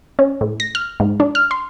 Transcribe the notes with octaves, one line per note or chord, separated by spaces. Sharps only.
C#4
A2
A#6
F6
G#2
D4
F6
C6